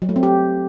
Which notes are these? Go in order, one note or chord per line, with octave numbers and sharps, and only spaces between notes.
F#3
A3
C4
G4